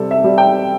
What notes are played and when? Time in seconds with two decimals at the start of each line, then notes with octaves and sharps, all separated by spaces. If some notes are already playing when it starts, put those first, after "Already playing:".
Already playing: C3 G3 A4
0.11 E5
0.24 G3
0.38 G5